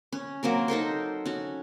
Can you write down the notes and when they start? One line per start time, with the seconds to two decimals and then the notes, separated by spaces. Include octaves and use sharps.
0.12 C#4
0.43 F#3 A#3 C4 A#4
0.68 D#4 A4 A#4 C5
1.26 C#4 F#4